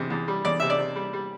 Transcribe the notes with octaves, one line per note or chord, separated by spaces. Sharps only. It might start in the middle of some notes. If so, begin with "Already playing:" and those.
Already playing: E2 C3
E2
G3
E2 D5
C3 E5
D5
C3
G3
G3